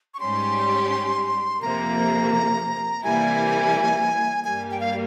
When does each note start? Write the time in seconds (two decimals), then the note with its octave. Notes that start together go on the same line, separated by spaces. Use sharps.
0.14 C#6
0.20 G#2 G3 C#4 G4 C6
1.62 F2 C3 F3 A#3 A#5
3.03 C3 E3 G3 A#3 E4 G#5
4.44 G2 G3 A#3 G#5
4.71 G5
4.80 F5